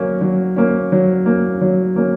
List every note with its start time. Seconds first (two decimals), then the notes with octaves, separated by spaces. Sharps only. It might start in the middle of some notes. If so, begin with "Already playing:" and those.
Already playing: F#3 A#3 C#4
0.21 F#3
0.56 A#3 C#4
0.92 F#3
1.26 A#3 C#4
1.61 F#3
1.96 A#3 C#4